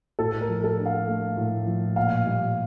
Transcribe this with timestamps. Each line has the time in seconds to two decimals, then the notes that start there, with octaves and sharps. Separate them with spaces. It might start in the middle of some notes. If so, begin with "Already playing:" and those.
0.19 A2 A4
0.41 A#4
0.49 F3
0.64 A4
0.78 D4
0.86 F5
1.08 A3
1.37 A2
1.67 F3
1.96 A#2 F5
2.26 G3